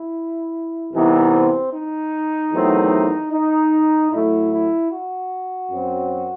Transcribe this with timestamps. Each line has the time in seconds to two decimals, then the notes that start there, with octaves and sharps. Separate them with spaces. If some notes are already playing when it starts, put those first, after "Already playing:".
Already playing: E4
0.93 C2 C3 E3 B3 D#4
1.33 C4
1.73 D#4
2.53 E2 D#3 F#3 A3 C4
3.32 D#4
4.11 A2 F#3 A3 E4
4.52 E4
4.91 F#4
5.71 F#2 F#3 C4